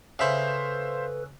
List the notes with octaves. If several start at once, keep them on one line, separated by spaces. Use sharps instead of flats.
C#3 A4 B4 C5 E5 F5 B5 C#6